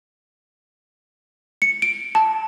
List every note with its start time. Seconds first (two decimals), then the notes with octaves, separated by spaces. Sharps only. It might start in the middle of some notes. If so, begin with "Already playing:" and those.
1.62 C#7
1.82 D7
2.15 A5